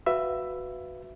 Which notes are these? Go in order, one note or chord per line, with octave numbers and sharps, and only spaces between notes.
F#4 B4 E5 F5